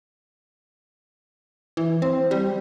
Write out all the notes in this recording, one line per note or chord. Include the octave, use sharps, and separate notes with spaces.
E3
C4
G3